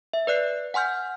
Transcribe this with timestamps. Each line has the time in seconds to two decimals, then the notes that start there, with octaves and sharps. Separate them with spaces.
0.13 E5
0.27 B4 D5 F#6 C7
0.74 F#5 G#5 C6 F6 G6